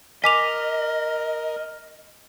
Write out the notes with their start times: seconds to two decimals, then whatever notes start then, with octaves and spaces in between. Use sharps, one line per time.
0.24 A#4 D#5 G#5 D6 B6 F7